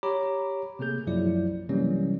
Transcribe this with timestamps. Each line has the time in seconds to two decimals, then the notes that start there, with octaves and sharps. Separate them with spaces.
0.03 G4 C#5 A#5 B5 D6
0.79 C3 A3 A#3 G#4 G6
1.07 B1 F#2 F3 F#3 E4 D5
1.69 C3 E3 F#3 G3 A#3 C#4